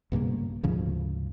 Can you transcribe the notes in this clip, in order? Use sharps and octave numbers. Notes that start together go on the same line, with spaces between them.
B1 G2 C#3 A#3
D2 G#2 C#3 F3